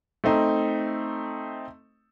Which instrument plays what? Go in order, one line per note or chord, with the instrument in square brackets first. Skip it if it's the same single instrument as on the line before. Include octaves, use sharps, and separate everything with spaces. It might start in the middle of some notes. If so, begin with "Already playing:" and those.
[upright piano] A3 C4 D#4